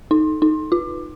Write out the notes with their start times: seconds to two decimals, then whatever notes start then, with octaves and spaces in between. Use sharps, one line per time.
0.11 D#4
0.42 D#4
0.72 F4